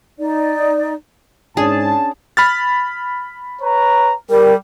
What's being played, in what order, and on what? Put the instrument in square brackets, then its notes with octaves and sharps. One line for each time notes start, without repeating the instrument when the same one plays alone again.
[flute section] D#4 D5
[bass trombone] G#2 [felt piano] C#4 D4 [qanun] G#4 [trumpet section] A5
[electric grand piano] B5 F6 A6
[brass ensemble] B4 C#5 A#5
[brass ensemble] G3 [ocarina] A#4